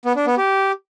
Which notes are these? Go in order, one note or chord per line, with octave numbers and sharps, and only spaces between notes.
B3
D4
B3
G4